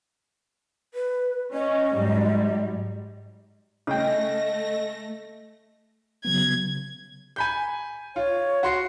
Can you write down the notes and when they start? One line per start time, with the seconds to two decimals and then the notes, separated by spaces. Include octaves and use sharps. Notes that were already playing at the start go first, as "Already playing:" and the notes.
0.94 B4
1.53 C#4 D#5
1.94 G#2 F#3 G3
3.87 C#3 A3 D#5 G5 A#6
6.25 C#3 F#3 B3 G#6
7.36 G#5 B5 G6
8.16 F4 C#5
8.63 F#4 C6 C7